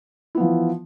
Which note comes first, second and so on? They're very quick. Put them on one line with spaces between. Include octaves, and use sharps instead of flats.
E4 B3 F3 E3